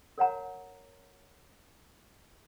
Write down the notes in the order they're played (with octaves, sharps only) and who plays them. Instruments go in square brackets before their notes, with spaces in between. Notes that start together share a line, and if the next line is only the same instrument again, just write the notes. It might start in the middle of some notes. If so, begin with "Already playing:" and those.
[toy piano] A#4 C#5 F#5 A#5